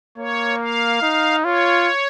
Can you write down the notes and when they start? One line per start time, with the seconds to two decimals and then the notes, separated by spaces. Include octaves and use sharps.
0.18 A#3 C#5
0.60 F5
1.02 D#4
1.44 F4 C#5